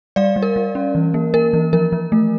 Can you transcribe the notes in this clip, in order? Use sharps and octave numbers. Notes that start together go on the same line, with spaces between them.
G3 D5 F5
G3
A#4
G3
C#4
E3
A#3
A#3 A#4
E3
F3 A#4
F3
A3